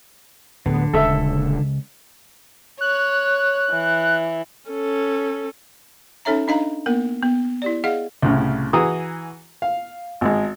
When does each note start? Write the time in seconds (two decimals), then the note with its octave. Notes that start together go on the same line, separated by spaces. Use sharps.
0.66 D1 D3 B3
0.93 D#1 C#3 G#3 C#4 A4 E5
2.81 C#5 F#6
3.71 E3
4.69 C#4 A4
6.25 C#4 D#4 A4 C#5 E5 A#5
6.48 D4 D#4 D#5 F5 A#5
6.86 A#3 B3 A#4
7.22 B3
7.62 E4 G4 D5
7.84 G#4 D#5 F5 F#5
8.22 C2 A2 C#3
8.73 E3 F#4 G#4 A#5 D#6
9.62 F5
10.21 G#1 G#3